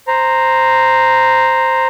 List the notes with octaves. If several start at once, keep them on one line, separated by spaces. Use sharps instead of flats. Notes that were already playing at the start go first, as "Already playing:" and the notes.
C5 A#5